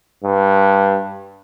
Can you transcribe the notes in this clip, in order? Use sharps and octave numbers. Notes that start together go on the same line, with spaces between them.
G2